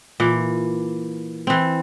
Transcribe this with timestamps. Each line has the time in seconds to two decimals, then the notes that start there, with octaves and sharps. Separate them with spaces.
0.20 A#2 E3
1.47 E3 C4